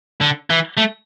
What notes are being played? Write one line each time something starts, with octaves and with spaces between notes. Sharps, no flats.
D3
E3
A3